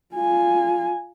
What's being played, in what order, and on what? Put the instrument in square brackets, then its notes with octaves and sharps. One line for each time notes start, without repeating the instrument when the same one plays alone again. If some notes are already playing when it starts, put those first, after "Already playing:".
[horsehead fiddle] F4 G#5